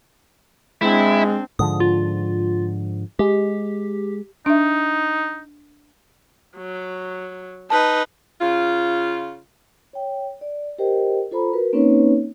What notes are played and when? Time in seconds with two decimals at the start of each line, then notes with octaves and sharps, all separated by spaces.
0.82 G#3 C4 D4 E4
1.59 G#2 D3 F3 D#6
1.80 F4
3.19 G#3 G4
4.46 D4 D#4 E5
6.57 F#3
7.70 D#4 B4 A5
8.41 C#3 F4
9.93 C#5 G5
10.41 D5
10.79 G4 A#4 C5 D#5 G5
11.31 F4 A4 C5 A#5 B5
11.53 F#4 A#4 B4
11.73 A#3 C4 C#4 D#4 B4 C#5